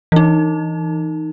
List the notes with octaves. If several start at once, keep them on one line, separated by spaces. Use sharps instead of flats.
E3 D#4